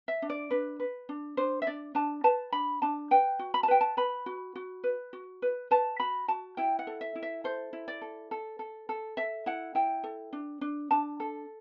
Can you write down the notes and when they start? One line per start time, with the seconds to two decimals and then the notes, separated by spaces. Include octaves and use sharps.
0.08 E5
0.22 D4
0.30 D5
0.51 D4 B4
0.80 B4
1.09 D4
1.37 D4 C5
1.62 E5
1.67 D4 D5
1.95 D4 A5
2.24 B4 A5
2.52 D4 B5
2.82 D4 A5
3.11 B4 G5
3.39 F#4
3.54 B5
3.63 A5
3.68 B4 G5
3.81 A5
3.97 B4 B5
4.26 F#4
4.56 F#4
4.84 B4
5.13 F#4
5.42 B4
5.71 B4 A5
6.00 F#4 B5
6.28 F#4 A5
6.57 E4 G5
6.79 F#5
6.87 A4
7.01 E5
7.15 E4
7.23 E5
7.44 A4 C5
7.73 E4
7.88 D5
8.02 A4
8.31 A4
8.59 A4
8.89 A4
9.17 A4 E5
9.46 E4 F#5
9.75 E4 G5
10.04 A4
10.33 D4
10.61 D4
10.91 D4 A5
11.20 A4